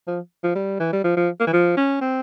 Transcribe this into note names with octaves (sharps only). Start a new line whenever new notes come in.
F3
F3
G3
E3
G3
F3
F3
A#3
E3
F3
C#4
C4